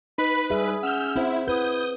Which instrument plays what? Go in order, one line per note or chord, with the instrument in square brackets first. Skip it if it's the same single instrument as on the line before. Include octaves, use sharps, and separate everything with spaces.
[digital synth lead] D#4 [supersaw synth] B4 [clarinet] B5
[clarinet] G3 [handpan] G#4 E5
[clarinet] C#4 [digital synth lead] F#5 [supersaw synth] E6 F6 G6
[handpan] C4 C5 [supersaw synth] E4
[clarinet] E4 [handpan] B4 [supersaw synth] D#6 G6